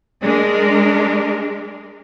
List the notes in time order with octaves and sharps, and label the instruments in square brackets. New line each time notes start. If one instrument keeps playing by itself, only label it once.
[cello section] G#3 D4 A#4